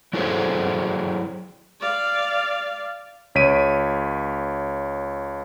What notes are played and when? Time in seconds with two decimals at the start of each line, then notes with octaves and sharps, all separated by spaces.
0.13 F#3 E4 F#4 G#4 A4 C5
1.81 D5 F5
3.35 C#2 C#5 B6 D7 D#7